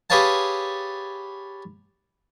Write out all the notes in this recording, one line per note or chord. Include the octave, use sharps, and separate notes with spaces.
G4 G#4 B4 C#5 F5 A5